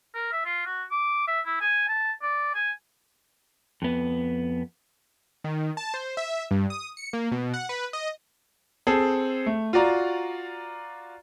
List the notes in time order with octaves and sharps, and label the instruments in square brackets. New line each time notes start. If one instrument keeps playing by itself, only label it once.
[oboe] A#4
E5
F4
F#4
D6
E5
E4
G#5
A5
D5
G#5
[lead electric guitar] F2 B3
[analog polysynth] D#3
A5
C5
E5
G2
D#6
C#7
A#3
B2
F#5
B4
D#5
[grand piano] C4 G#4 A4
A3
F4 F#4 D5 A#5